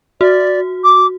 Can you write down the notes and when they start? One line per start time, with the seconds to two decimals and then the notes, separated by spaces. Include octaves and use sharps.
0.21 F#4 D5
0.84 D6